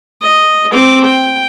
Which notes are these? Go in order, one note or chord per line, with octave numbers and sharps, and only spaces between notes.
D#5
C4 D6
G5